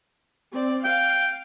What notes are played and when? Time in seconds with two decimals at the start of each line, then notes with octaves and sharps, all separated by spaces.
0.53 C4 D5
0.85 F5 G5